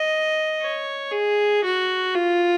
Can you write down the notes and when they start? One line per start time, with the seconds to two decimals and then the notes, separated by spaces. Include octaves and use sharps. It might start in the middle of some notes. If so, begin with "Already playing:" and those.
Already playing: D#5
0.61 C#5
1.12 G#4
1.64 F#4
2.15 F4